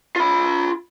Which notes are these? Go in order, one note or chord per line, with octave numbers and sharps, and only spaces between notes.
F4 B5